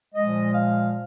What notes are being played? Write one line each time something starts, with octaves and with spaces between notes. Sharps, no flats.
A#2 F3 G#3 D#5
F5